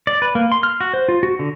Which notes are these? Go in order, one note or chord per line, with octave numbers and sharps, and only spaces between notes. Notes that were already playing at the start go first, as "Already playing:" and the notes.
D5
B4
A#3
C6
F6
F#4
C5
F4
F#4
D3